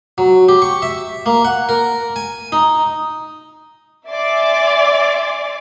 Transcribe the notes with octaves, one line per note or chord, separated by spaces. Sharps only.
F#3
G4
C#6
E5
A#3
F#5
A#4
G#5
D#4
D5 E5 G#5 C6 D6